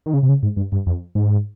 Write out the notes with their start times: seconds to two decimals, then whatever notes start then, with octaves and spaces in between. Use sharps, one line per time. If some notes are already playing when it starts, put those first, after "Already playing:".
0.06 D#3
0.14 C#3
0.23 C3
0.29 C#3
0.43 G#2
0.57 G2
0.72 G2
0.86 F2
1.15 G#2